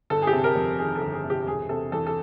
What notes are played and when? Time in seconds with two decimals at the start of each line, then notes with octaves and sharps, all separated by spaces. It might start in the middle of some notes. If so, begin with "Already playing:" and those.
0.10 G1 A4
0.22 G#4
0.27 G4
0.33 C3
0.44 A#4
0.56 F2
0.79 D#3 G#4
0.95 A4
1.01 G1
1.13 G#4
1.24 C3
1.30 G4
1.47 E1 G#4
1.69 C3 A4
1.92 E2 A4
2.07 A4